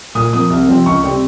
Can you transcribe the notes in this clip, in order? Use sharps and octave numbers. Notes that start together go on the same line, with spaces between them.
A#2 D#6
F3 A#3 D#6
C2
C3 F3 C4
C#2 C#6
C3 G3 C4